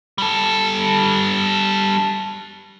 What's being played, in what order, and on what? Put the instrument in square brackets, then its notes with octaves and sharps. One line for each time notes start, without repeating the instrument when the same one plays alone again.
[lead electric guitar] G3 A4